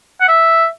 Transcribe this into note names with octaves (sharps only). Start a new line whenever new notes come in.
F#5
E5